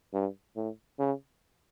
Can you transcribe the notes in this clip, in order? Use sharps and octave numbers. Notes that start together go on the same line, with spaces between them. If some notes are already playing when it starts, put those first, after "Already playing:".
G2
A2
C#3